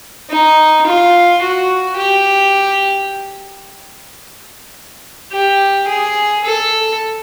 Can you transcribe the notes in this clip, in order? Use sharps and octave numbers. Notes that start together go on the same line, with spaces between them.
D#4
F4
F#4
G4
G4
G#4
A4